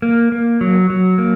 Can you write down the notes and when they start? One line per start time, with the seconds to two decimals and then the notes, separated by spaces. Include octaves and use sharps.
0.02 A#3
0.32 A#3
0.61 F#3
0.90 F#3
1.18 A#3